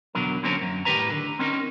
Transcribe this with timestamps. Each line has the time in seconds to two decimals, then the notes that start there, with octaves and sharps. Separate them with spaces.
0.15 E2 B2 D3 F#3 A#4
0.43 D3 F#3 A#3 C4 C#4 A#4
0.61 F#2
0.85 A2 D#3 G4 A#4 B4 A#5
1.10 D3
1.39 C4 C#4 D#4 A#4